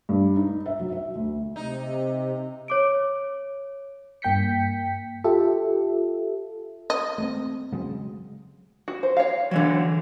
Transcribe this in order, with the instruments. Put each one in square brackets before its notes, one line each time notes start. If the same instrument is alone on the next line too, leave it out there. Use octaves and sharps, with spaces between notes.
[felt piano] G2
D#4
E5
F#3
E5
D2
[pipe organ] C3 [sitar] D#4
[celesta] C#5 D6 D7
[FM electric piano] G2 A#3 G5 G6 B6 C#7
F4 G4 A4 E5
[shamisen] D#5
[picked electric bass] A3 A#3 C4
C#3 F#3 G#3
[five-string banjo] F#4
C5
C#5 F5
[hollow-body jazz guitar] D3 E3 F#3